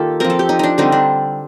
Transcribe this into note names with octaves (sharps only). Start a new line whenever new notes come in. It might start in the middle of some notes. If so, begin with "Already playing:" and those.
Already playing: D#3 A#3 F4 G4 A4
F3 C4 A#4
A4
G4
D#4
D4 D#4
D3 G3 C4 D#4
D4